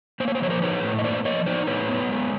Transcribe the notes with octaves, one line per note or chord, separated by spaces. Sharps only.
A#3 C5
C#5
C5
F3 C#5
A#4 C5
D#4 B4 C#5
A2
D#5
A#3 C5 D5
F3 C#5 D#5
D#4 C5 D5
A2 B4 C#5
B3
G#3